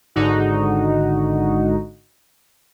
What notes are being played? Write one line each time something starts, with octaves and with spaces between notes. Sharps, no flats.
G#1 G#2 D3 D#4 F#4